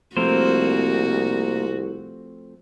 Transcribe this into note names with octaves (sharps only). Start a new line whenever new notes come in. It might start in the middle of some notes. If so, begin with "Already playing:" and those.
C2 F3 A3 A#3 C4 F#4 A#4 C5